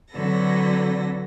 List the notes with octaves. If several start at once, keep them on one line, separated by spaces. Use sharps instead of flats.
D3 F#3 C4 A4 B4 A#6